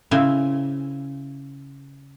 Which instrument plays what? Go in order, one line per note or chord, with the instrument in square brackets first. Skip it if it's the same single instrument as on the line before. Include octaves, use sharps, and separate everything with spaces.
[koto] C#3 C4 E4 G#5